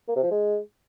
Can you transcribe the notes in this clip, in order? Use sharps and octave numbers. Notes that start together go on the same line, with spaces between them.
A#3
C3
F3
G#3